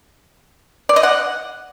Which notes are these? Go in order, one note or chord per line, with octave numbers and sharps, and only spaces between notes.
D5
D#5
F#5